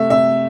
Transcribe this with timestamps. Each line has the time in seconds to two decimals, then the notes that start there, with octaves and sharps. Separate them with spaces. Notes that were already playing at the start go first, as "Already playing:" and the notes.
Already playing: C3 A3 E5
0.10 C3 E5